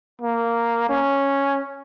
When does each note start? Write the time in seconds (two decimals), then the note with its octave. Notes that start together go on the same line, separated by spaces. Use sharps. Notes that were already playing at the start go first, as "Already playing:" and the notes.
0.21 A#3
0.90 C#4